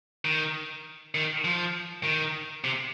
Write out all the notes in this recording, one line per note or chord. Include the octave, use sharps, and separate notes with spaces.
D#3
D#3
F3
D#3
C3